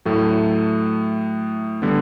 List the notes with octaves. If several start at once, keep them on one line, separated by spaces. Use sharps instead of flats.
A2 F#3 A3
D3 G3 B3